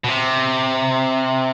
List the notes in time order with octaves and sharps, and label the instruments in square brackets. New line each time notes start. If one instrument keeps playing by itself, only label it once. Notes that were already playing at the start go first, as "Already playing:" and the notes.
[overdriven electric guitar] B2
C3